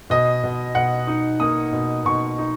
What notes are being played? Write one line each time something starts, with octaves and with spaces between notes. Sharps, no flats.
B2 D#5
B2
B2 F#5
D#4
A#3 D#6
B2
B2 C#6
D#4